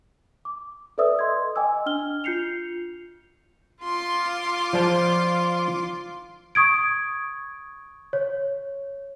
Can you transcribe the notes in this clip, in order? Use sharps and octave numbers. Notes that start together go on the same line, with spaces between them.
D6
A4 B4 D5 E5 D#6 E6
D#5 C6 G#6
D#5 G5 G#5 D6 E6
D4 F6 G7
F4 G6 C7 C#7 F7
F4 C6 D6
F3 D5 A5
C#6 D#6 G#6 D7
C#5